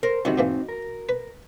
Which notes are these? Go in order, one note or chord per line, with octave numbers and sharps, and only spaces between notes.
A#4 C5
C2 C3 D#3 C4 D#4 F#4
G#2 E3 A#3
A#4
B4